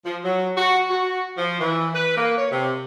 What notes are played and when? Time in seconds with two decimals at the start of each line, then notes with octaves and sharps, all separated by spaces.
0.06 F3
0.24 F#3
0.58 F#4
0.90 F#4
1.38 F3
1.60 E3
1.95 B4
2.17 A#3
2.37 C#5
2.52 C3